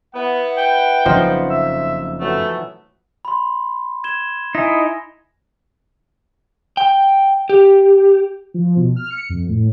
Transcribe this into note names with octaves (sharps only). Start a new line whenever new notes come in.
B3 E4 B4 F#5
G5
F#1 F2 F3 C#4 D#4 C5
E5
E3 F#3 A3 B3
B5 C6
G#6 E7 G7
D#4 E4 G#5 A#6
G5
G4
F3
B2
F6
C#7
F2
A2